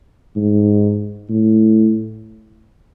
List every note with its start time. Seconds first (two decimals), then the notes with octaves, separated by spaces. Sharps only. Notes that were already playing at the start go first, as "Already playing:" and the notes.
0.36 G#2
1.29 A2